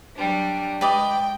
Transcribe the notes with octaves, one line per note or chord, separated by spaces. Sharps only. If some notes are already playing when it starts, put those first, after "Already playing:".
F#3 G3 D4
G#3 B4 D5 D#5 G5